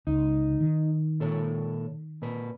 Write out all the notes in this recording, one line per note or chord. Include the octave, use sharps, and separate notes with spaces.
C#2 D#4
D#3
A#2 A4 C#5
A#2 B4